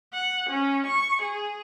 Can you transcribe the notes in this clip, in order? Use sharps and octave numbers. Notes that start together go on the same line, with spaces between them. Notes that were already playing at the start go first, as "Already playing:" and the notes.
F#5
C#4
C#6
G#4